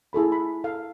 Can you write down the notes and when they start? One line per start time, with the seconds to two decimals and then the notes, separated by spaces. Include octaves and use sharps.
0.13 E4 G#4 A4 B5
0.32 B5
0.64 A4 F5